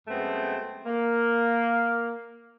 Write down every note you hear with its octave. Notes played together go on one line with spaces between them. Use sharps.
F#2 G#3 A3 B3 C4
A#3